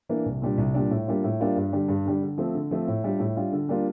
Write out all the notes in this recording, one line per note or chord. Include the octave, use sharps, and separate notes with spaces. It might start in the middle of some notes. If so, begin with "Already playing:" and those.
E3 A#3 D4
C2
A#2 G3 D4
C2
A#2 G3 D4
A2
G3 A#3 D4 F4
A2
G3 A#3 D4 F4
G2
D3 G3 D4
G2
D3 G3 D4
D3
F3 A3 C4
D3
F3 A3 C4
A2
G3 D4 F4
A2
G3 D4 F4
D3
G3 A#3 D4 F4